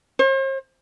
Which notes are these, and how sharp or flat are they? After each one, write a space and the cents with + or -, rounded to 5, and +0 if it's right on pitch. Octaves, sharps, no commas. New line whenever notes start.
C5 +45